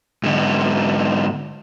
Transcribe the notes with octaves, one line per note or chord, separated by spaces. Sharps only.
G#2 D3